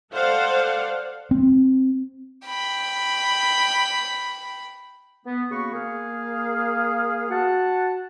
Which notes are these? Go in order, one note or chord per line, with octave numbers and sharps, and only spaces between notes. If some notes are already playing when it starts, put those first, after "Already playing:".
A4 C5 D5 F5 F#5
C4
G5 B5
B3
C#3 A#3 B3 F#4 B5 C#6
A#3 G#4 F5
F#4 F#5 A5